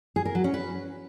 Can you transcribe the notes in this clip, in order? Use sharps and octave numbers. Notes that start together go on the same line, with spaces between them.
G#4
A#4
F#3
C#4
B4